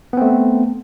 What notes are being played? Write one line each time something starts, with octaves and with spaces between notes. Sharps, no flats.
A3 B3 C4